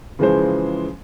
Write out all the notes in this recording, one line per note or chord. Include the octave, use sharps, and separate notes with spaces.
C#3 E3 F3 G#3 G#4 C5